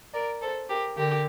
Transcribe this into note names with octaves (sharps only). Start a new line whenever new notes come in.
A#4 D5
A4 C5
G4 A#4
D3 G4 A#4